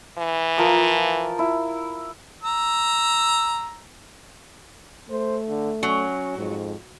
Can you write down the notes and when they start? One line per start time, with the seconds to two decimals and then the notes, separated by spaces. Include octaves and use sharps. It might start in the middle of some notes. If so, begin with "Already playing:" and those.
0.18 E3
0.58 F3 A#4 D#6
1.39 E4
2.43 A#5 E6
5.10 A3 C5
5.48 D3
5.83 F#3 C#4
6.38 F2 G#2